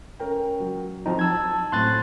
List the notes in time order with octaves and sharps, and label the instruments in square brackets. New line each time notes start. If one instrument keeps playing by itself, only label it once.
[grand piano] C#4 A#4 G5
F#3
[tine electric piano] F3 C4 D#4
A5 E6 G#6
[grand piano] F#2 A2 C4 [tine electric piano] C6 F#6 A6